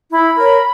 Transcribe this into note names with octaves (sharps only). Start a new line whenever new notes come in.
E4 B5
A#4 C#5